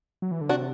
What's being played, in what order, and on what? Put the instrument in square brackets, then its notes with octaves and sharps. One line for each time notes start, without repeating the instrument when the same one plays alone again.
[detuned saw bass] F#3
E3
D3
[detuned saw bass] C3 [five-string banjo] D4 F#4